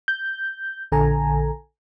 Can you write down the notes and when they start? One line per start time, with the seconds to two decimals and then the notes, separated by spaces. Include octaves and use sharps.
0.08 G6
0.92 A#1 D3 A4 G#5 A#5